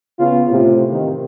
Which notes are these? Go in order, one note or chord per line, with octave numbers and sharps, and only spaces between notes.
C#3 B3 F4
A2 C3
C3 D#3